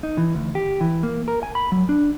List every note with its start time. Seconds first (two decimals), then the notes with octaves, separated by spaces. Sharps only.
0.03 D#4
0.18 E3
0.35 D2
0.55 G4
0.81 E3
1.03 A#3
1.28 A#4
1.43 G#5
1.55 B5
1.72 F#3
1.89 D4